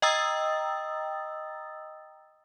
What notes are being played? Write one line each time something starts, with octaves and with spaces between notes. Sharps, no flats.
D#5 G5 A#5 D#6 E6 A6